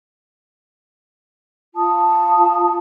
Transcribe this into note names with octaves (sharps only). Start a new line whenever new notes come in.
F4 A5 D#6